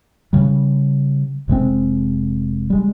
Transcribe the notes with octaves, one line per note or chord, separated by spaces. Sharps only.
C#3 G3
F1 C3 G#3 C4
G3 G#3